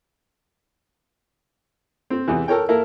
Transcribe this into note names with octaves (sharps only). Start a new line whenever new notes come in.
C4
E2 C3 E3
A4 A#4 C#5 G5
A#3 E4 A4 A#4